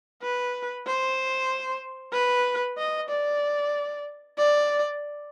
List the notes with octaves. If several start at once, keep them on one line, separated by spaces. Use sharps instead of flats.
B4
C5
B4
D#5
D5
D5